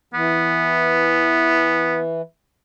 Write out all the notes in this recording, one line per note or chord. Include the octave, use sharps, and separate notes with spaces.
E3 B3